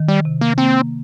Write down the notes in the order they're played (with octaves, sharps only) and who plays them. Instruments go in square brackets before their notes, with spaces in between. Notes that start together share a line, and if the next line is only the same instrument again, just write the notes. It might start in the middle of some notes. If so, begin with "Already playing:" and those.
Already playing: [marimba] D#3
[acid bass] G3
[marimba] C3
[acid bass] A#3
[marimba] A#3 [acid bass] C4